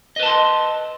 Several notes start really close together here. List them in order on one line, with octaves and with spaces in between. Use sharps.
D#5 B4 A5 C6